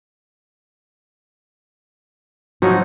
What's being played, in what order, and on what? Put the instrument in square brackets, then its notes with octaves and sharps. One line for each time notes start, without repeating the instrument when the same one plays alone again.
[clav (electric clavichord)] F3 F#3 D#4 [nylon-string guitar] F#4